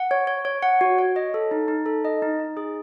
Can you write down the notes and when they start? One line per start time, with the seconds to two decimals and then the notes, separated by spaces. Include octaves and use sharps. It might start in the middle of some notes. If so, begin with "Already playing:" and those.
Already playing: F#5
0.11 C#5
0.27 C#5
0.45 C#5
0.63 F#5
0.81 F#4
0.98 C#5
1.16 D#5
1.34 A4
1.51 D#4
1.68 D#4
1.86 A4
2.05 D#5
2.22 D#4
2.40 D#4
2.57 G#4